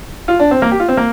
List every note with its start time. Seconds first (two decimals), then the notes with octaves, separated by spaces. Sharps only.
0.28 F4
0.40 D4
0.51 C4
0.62 A#3
0.72 G4
0.80 F4
0.88 C4
0.97 A#3